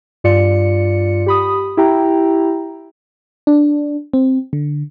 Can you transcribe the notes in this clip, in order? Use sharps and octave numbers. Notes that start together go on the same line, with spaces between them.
G2 F4 D5 C#7
G4 B5 D#6
E4 G4 G5 A#5
D4
C4
D3